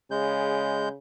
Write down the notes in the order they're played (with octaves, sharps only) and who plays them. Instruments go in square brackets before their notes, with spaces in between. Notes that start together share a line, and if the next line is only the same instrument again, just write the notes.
[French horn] C#3 [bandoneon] G#3 G6